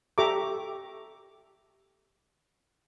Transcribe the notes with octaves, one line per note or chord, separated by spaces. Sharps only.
G4 A4 E5 A#5 C#6 D6